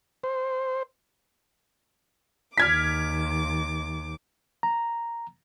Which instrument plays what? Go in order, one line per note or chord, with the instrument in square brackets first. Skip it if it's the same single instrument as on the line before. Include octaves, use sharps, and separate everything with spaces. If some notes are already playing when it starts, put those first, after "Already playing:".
[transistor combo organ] C5
[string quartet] D#2 D6 [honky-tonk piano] F6 G#6 B6
[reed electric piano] A#5